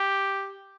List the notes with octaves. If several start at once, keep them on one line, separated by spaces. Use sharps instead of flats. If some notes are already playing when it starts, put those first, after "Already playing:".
Already playing: G4